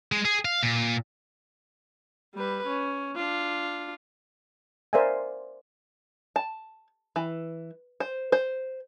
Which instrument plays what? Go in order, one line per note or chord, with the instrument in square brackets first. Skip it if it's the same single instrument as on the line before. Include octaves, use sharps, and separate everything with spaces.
[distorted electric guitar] G#3
G#4
F5
A#2
[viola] G3 B4
C#4
D4 F4
[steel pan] A#4 C5 D5 E5 F5 G#5
[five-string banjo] A5
E3
C5
C5